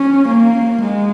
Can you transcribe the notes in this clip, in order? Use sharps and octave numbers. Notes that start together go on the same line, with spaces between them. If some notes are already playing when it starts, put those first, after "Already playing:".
Already playing: C#4
A#3
G#3